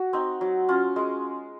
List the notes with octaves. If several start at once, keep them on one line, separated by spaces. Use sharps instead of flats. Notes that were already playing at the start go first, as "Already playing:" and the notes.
Already playing: F#4
C4 D#4
F#3
C#4 F4
G#3